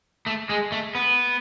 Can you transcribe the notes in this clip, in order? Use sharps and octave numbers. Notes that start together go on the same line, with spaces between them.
A3
G#3
A3
B3